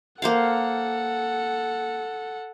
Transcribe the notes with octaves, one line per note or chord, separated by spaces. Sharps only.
A#3 A4 C5 F5 F#5